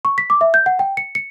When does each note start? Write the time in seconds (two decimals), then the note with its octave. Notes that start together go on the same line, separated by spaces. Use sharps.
0.05 C#6
0.18 B6
0.30 D6
0.41 E5
0.54 G6
0.66 F#5
0.79 G5
0.97 C#7
1.15 C#7